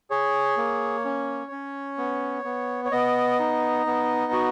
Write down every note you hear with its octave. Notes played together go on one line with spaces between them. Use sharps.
G#4 C#5
A#3
C#4
C#4
B3
B3
C#5
B3 D#5
D#4
B3
F#4